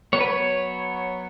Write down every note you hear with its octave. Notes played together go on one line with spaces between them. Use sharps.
F#3 B3 C#5
B4
C#5